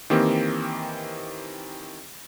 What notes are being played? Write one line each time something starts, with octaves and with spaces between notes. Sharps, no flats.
D#3 E3 A#3 C4 G4